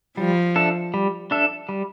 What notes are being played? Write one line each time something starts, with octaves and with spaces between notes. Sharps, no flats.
F3 G3
D4 A4 E5
G3
D4 A4 E5
G3